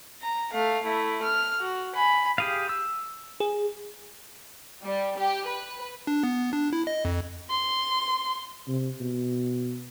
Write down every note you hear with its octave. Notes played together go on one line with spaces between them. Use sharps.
A#5
A3 F5
A3 E4
F6
F#4
G#5 B5
G4 G#4 F5
E6
G#4
G3
G4
B4
D4
B3
D4
E4
D#5
F2
C6
C3
B2